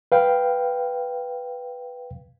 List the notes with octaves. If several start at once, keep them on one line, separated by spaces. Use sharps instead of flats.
B4 F5 G5